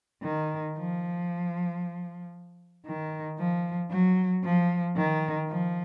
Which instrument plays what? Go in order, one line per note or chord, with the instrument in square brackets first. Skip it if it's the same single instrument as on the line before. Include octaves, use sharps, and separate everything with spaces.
[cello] D#3
F3
D#3
F3
F#3
F3
D#3
F3